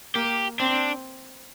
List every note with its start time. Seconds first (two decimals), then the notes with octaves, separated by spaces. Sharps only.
0.15 A#3 G4
0.59 C4 D4